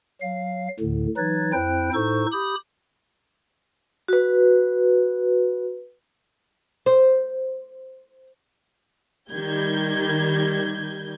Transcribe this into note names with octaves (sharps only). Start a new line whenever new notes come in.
F#3 F5
D2 A2 D3
E3 F#3 D#4 B4 G#6 A6
F2 C4 E4 C5 G5 F#6
A2 D#4 A4 C5 C#6 G6
G4 B5 D#6 G6
F#4 B4
C5
D#3 G3 G6 G#6